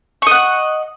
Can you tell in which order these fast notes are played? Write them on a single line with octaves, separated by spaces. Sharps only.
C#6 D#5 F#5